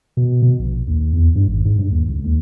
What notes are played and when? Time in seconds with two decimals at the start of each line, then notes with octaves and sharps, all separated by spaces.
0.17 B2
0.42 B2
0.59 A#1
0.88 D#2
1.13 E2
1.35 G2
1.48 G#1
1.65 G#2
1.79 G2
1.91 D#2
2.08 C#2
2.24 D#2